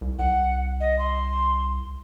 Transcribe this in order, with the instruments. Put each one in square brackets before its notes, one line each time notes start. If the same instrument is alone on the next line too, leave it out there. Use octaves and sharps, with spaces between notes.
[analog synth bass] C2
[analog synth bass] C2 [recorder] F#5
[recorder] D#5
C6